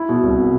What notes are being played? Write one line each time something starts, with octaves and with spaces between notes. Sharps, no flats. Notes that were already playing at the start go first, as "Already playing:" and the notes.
Already playing: E4
B2
C2